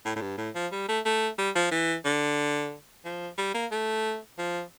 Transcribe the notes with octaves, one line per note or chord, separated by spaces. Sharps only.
A2
A2
G2
A2
F3
G3
A3
A3
G3
F3
E3
D3
F3
G3
A#3
A3
F3